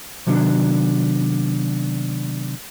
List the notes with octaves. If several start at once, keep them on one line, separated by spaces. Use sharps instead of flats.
C3 D#3 F#3 B3 C#4 D4